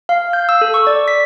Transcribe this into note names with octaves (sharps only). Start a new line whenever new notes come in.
F5
G6
E6
A4
C#6
D5
B6